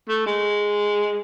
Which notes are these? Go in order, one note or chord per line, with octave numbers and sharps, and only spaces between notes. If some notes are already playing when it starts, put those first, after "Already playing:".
A3
G#3